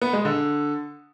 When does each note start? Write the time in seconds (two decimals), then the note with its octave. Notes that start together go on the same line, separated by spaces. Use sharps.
0.02 B3
0.13 G#3
0.25 D3